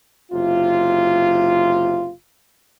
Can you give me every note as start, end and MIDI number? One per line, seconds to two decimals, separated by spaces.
0.32 2.11 30
0.32 2.11 48
0.32 2.11 65